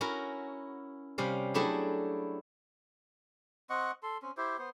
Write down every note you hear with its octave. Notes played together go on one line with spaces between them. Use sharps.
C#4 E4 F#4 A#4
C3 G3 C#4 F5
F#3 A3 D4 E4 G4 G#4
C4 D#5 F#5 C#6
A4 C6
C4 C#4
E4 G4 C5
B3 C5